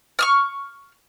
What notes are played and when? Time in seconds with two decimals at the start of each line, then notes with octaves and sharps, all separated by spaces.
0.19 C#6 D#6 F6